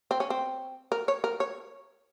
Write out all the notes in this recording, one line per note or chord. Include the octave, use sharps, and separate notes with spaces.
C4
C#4
C4
A#4
C#5
A#4
C#5